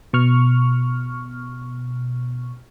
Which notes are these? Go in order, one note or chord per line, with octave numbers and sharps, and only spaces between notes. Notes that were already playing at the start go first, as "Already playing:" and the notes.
B2 C#6 F6